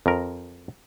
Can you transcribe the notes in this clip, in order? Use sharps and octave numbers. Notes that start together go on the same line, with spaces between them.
F2 A#4